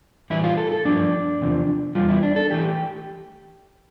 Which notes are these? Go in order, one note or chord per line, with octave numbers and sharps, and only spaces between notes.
A2 E3 G3 E4
F4
A4
A4
G2 F3 A3 D4
E2 C3 F3
E2 B2 G3 F4
E4
D4
A4
E3 A3 G4